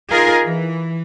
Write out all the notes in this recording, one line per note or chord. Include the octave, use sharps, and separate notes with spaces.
D#4 F4 G#4 A#4
E3